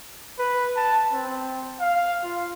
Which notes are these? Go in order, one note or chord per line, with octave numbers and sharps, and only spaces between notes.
B4
A5
C4
F5
F4